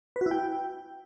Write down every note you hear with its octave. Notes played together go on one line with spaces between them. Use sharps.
B4
F#4
E4
G5